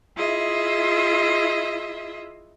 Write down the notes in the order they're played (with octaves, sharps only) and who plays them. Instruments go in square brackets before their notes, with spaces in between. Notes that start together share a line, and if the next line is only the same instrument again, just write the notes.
[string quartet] E4 F4 G#4 D#5 E5